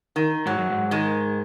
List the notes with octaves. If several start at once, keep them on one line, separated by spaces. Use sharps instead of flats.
D#3
G#2 F#3
F#2
G#2
D#3 G#3